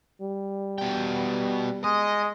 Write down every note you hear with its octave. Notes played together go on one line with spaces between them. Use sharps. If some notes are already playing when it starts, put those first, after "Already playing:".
G3
B2 G5
G#3 D#5